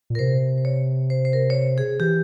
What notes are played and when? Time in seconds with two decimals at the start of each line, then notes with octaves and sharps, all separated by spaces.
0.10 A#2
0.15 A#4
0.19 C3 C5
0.58 C5
0.65 C#5
1.10 C5
1.25 C5
1.33 A#4
1.50 C#5
1.55 C5
1.78 G#4
2.00 E3 G4